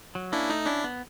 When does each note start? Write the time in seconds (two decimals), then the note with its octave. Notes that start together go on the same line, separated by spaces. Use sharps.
0.15 F#3
0.32 A#3 C#4 D4 E4
0.49 A3 D#4
0.66 C#4 D4 E4
0.84 B3